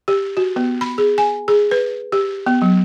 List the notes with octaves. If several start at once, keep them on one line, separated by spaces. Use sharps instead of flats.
G4
F#4
B3
B5
G#4
G#5
G#4
B4
G4
B3
F#3